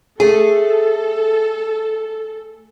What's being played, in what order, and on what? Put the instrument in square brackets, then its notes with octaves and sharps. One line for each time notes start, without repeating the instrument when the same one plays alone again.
[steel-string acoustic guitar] A3 G#4 [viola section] A4